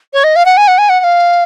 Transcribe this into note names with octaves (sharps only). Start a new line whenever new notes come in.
C#5
D#5
F5
F#5
G#5
F#5
G#5
F#5
F#5
F5